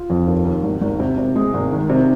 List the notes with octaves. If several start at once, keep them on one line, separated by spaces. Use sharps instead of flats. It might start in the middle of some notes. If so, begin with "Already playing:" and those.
Already playing: F4
F2
D#2
D#2
G#1
G#1
C3
C3
G#3
G#1
D#3
C3